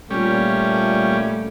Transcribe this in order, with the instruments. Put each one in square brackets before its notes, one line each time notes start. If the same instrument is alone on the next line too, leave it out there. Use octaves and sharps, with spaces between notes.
[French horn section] A#2 A3 [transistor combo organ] G3 C#4